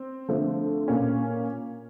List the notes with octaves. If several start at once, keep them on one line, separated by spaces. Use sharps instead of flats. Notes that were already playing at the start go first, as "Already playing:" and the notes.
Already playing: C4
D3 F3 A3 C4
A#2 A#3 C#4